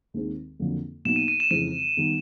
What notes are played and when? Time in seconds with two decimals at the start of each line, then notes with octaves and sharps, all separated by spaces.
0.14 D#2 D#3 G#3 C4
0.59 F2 D3 F#3 A#3
1.05 B2 F#3 A#3 D#4 F#4 E7
1.16 D#7
1.28 D#7
1.40 E7
1.50 F2 C#3 E3 G#3 C4 D#7
1.97 D#3 G3 B3